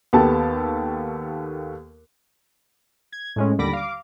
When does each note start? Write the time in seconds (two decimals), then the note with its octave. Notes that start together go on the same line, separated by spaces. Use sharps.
0.13 D#2 B3 G4 A4 A5
3.12 G#6
3.36 A2 G#3 C#4
3.58 D#2 D3 G3 B5 D6 A#6
3.73 F5 D6